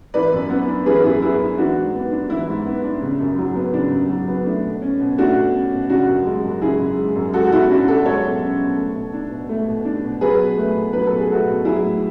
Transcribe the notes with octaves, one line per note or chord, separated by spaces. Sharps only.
E3 B4 D5
F#2
B3
D4
E3 G#4 B4
F#2 E4 G#4
B3 E4 G#4
D4
E3 D4 F#4
G#2
B3
D4
E3 E4
G#2
B3
D4
C#3
F#2
F#3
B3
C#3 D4
F#2
F#3
B3
A3 D4
B2
C#4
B2
A3 D4 F#4
B2
C#4
B2
C#3 D4 F#4
F#2
G#3
F#2
C#3 E4 G#4
F#2
G#3
F#2
G#3 F#4 A4
F#4
B2 E4
C#4 D4 F#4
B2 F#4 A4
G#3 A4 C#5
B2
C#4
B2
A3
B2
D4
B2
A3
B2
D4
B2
F#3 G#4 B4
B2
A3
B2
F#3 B4
B2 A4
G#4
A3 F#4 A4
B2
F#3 E4 G#4
A2